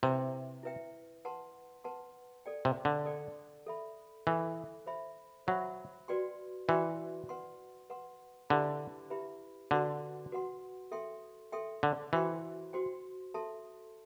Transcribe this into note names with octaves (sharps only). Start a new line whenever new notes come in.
C3 E4 B4 E5 G5
E4 B4 E5 G5
B4 F#5 A5 C6
B4 F#5 A5 C6
A4 D5 G5
C3
D3
A4 D5 G5
A4 E5 B5
E3 A4 E5 B5
C5 E5 B5
F#3 C5 E5 B5
F#4 B4 D5 G5 C6
E3 F#4 B4 D5 G5 C6
B4 F#5 C6
B4 F#5 C6
D3 E4 G4 B4 E5 B5
E4 G4 B4 E5 B5
D3 F#4 B4 F#5 C6
F#4 B4 F#5 C6
A4 E5 G5 C6
A4 E5 G5 C6
D3
E3 F#4 C5 G5 C6
F#4 C5 G5 C6
A4 E5 A5 C6